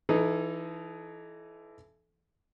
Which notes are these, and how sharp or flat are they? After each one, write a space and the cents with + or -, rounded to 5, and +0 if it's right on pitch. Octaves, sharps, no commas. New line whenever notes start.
E3 +15 D#4 +0 A4 -25